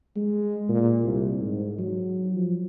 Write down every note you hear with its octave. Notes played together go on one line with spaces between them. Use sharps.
G#3
A#2
C2
G#2
F#3
F3